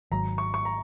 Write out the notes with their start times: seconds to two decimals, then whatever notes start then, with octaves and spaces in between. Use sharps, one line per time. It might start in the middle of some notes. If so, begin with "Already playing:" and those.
0.12 G#1 G#2 F#3 A#5
0.38 C#6
0.54 C#6
0.65 A#5